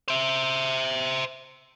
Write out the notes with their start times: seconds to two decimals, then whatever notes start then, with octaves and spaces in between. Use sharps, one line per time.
0.08 C5 E5